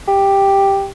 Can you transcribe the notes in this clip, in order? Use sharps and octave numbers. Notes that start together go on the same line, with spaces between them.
G4